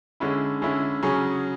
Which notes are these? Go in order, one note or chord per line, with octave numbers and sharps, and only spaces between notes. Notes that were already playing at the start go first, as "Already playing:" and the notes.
D3 G#3 C#4 E4
D3 G#3 C#4 E4
C#3 F#3 C#4 G#4